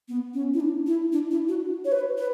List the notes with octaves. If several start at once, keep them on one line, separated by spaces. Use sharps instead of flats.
B3
C#4
E4
D4
E4
D4
E4
F#4
C#5
B4
B4